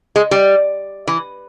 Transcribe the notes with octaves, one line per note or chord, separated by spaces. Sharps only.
G#3
G3
E3